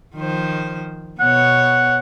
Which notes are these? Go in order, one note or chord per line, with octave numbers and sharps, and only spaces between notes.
D#3 F3 C5
B2 B3 C#5 F#5